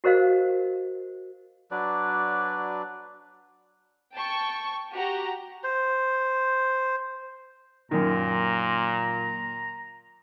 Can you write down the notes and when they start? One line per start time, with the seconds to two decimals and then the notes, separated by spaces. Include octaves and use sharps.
0.04 F#4 A#4 C5 D#5 F5
1.71 F#3 D4 B4 D5
4.15 G5 A5 C#6
4.93 F#4 G4 F#5 A#5
5.64 C5
7.91 F#2 A#2 D#3 A#5